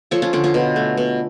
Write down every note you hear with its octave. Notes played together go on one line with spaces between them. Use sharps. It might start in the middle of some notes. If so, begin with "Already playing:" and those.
F3 A4 C#5
C#4 F4
D3 C#4 F4
C#4 F4
B2
A3
B2